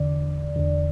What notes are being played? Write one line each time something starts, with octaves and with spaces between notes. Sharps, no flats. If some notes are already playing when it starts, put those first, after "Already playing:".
Already playing: E2 D3 D5
E2 D3